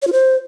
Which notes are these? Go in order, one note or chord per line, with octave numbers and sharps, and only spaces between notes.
C#5
F4
C5